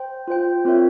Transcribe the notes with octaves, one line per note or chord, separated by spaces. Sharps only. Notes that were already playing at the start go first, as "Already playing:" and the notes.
Already playing: C5 G5
F4 C5 G5
C4 F4 A#4 C#5 E5